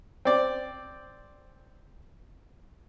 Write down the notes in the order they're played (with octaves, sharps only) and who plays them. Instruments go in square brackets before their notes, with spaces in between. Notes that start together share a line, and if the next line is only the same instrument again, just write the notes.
[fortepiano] C4 D5